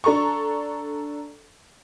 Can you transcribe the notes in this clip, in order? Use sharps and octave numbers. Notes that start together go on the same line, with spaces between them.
D4 A4 A#5 C#6